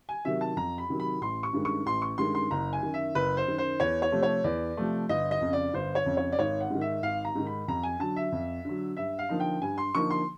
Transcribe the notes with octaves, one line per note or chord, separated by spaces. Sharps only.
G#5
C3 D#3 F#3 E5
A5
F2 A#5
B5
C3 D#3 F#3
B5
A1 C6
C#6
G2 D#3 G#3 C#4
C#6
A1 C6
C#6
G2 D#3 G#3 C#4 C6
C6
F#1 A#5
G#5
F#2 D#3
E5
F#1 B4
C5
F#2 D#3
C5
E2 C#5
C#5
C3 F3 A3
C#5
E2 D5
C3 F3 A3
G1 D#5
D#5
F2 C#3
D5
G1 C5
C#5
F2 C#3
C#5
D5
G#1 C#5
F#5
G#2 D#3
E5
G#1 F5
A#5
G#2 D#3
B5
F2 A#5
G#5
D3 F#3 A5
E5
F2
D3 F#3
G2 E5
F5
D3 F3 A#3 D#4
G5
G2 G#5
C6
D3 F3 A#3 D#4 C#6
C6